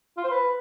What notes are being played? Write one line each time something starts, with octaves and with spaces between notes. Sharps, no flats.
F4
C5
B4